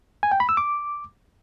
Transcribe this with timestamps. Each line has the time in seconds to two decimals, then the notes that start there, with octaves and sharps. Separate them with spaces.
0.23 G#5
0.32 G5
0.40 B5
0.49 E6
0.57 D6